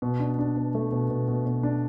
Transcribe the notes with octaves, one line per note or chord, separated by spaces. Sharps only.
B2
D4
D4
B2
A3
B2
B2
B2
B2
D4